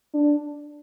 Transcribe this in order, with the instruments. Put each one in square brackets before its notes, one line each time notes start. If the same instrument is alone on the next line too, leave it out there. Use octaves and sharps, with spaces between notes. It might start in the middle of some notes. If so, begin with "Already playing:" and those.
[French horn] D4